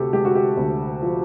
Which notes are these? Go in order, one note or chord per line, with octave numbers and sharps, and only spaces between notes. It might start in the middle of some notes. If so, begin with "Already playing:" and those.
Already playing: D2 C3 F#4 G4 A4
G#3 G4
F#4
G4
D2
F3